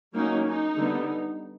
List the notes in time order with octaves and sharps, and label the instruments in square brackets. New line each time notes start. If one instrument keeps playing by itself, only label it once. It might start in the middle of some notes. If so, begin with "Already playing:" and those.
[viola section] F#3 A#3 C#4 D#4
D#4
D3 G3 B3